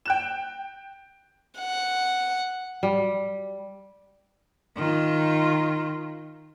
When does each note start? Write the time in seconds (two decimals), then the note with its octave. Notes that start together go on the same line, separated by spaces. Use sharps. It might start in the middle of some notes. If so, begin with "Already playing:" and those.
0.06 G5 F#6 E7
1.59 F#5
2.83 G3
4.76 D#3 F4